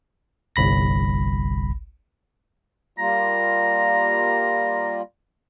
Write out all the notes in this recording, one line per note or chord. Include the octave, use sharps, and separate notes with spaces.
G1 C2 B5 A#6
G3 A#3 F4 A#5